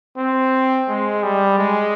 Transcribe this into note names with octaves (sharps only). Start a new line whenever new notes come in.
C4
G#3
G3
G#3